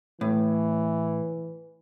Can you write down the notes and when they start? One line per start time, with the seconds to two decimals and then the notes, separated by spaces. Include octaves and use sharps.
0.21 A2 E3